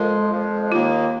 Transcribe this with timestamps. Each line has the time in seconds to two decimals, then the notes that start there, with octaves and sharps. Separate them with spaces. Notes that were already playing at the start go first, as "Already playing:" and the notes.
Already playing: F2 F3 G#3 A#4
0.30 F2 F3 G#3
0.71 D#2 D#3 A#3 F4